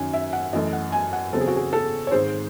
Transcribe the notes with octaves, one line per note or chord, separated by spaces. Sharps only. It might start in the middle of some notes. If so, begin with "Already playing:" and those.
Already playing: F#2 D#3 F#3 C#4 G#5
E5
F#5
F#2 E3 A3 D#5
F#5
G#5
F#5
E2 C#3 F#3 C4 A4
G#4
F#4
G#4
A4
C#5
G#2 D#3 G#3 C4 C5